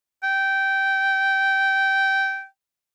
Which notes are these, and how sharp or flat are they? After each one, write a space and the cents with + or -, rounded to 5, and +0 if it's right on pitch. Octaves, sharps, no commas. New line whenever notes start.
G5 -15